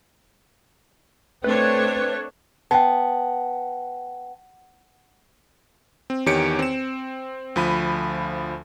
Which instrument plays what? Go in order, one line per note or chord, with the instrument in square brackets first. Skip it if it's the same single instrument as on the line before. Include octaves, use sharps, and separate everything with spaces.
[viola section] A3 D4 C#5 [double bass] C4 [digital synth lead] B4
[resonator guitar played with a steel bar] B3 [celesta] G5 A5
[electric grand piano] C4
E2 D#3 G4 C#5 C#7 D7
C4 E7
D2 F3 B5 D#7